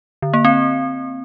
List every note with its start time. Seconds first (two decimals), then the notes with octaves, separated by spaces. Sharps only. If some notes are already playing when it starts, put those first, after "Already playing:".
0.22 D3
0.34 A#3
0.45 C4